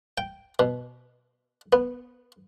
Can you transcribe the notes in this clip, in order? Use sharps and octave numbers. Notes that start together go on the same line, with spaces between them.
G5
B2
B3